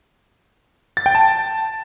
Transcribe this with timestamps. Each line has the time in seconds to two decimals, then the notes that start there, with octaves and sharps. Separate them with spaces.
0.97 A6
1.06 G5
1.15 A5